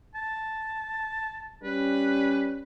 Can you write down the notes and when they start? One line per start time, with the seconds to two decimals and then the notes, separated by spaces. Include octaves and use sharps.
0.15 A5
1.63 G3 C#4 B4